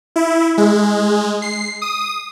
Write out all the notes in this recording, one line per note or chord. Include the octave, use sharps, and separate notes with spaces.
E4
G#3
C7
D#6